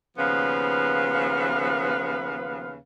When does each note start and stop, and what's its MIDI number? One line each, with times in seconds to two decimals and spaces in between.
0.17 2.76 39
0.17 2.76 49
0.17 2.76 53
0.17 2.76 59
0.17 2.76 71
0.17 2.76 77